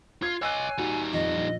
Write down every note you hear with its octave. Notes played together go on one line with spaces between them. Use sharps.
F4 G#6 C7
C#5 D#5 G#5 E6 F#6
G3 D#4 F#4
F2 D#5
A#1